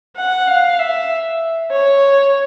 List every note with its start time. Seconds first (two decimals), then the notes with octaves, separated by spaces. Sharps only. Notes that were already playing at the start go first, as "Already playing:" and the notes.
0.17 F#5
0.47 F5
0.79 E5
1.71 C#5